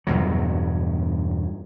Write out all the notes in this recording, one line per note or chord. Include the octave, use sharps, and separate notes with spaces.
E2 G2 B2 F#3